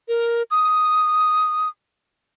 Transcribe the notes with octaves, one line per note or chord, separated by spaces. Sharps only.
A#4
D#6